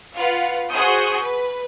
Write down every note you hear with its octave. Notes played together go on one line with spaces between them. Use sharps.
F4 B4 F5 F#5
F#4 G#4 C5 D#6 G6
B4